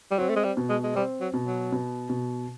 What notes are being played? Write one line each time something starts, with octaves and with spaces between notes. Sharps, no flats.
G3
F#3 C4
A3
G#3
G3
B2
G#3
G#3
G3 C4
F#3
B2
F#3
B2
B2